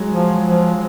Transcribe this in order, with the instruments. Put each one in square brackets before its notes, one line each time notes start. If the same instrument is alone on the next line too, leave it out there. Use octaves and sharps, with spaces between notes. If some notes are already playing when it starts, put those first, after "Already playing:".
Already playing: [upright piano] F#3 G#3
[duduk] F3
F3